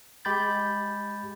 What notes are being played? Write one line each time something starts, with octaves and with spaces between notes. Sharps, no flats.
G#3 G4 B5 G6 A6